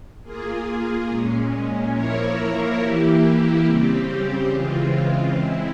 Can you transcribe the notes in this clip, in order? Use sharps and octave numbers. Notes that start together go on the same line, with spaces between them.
A#3 F4 G#4
A#2 G#3 C#4
F3 A#3 E4 A#4 C#5
E3 A#3 E4 G4
C#3 G3 C4 G4
C#3 E3 G#3 C4 F4
G#3 C4 E4